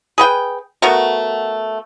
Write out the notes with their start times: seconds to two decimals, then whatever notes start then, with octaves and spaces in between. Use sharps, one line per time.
0.18 G#4 B4 G5
0.82 A3 B3 F#4 A#4